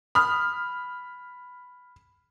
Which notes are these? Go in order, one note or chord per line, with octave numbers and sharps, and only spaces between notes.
B5 D#6 F6